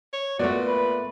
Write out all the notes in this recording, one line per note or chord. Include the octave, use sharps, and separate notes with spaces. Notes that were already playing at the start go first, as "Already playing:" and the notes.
C#5
A#2 A3 B3 F#4 D5
B4